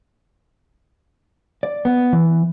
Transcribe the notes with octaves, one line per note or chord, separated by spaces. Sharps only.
D5
B3
E3